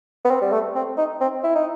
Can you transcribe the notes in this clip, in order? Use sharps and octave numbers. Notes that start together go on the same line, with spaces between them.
B3
C4
G3
A3
C4
D#4
C4
E4
D#4